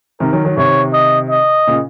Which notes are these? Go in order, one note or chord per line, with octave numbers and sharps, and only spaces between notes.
C3 D#3 A#4
D#3 F#3
D#3 F#3
C3 D#3 C#5
D#5
D#5
A#2 C#3